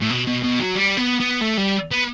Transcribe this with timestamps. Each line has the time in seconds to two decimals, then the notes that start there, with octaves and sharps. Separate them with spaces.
0.01 A2
0.10 B2
0.27 B2
0.44 B2
0.59 F#3
0.76 G3
0.98 B3
1.20 B3
1.42 A3
1.58 G3
1.91 B3